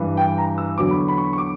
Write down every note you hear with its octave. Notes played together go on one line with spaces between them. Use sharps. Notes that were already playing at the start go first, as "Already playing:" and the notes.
Already playing: G2 E3
G5
A#5
E6
E2 D3 F#3 D6
B5
C#6
B5
C#6
C#6
D6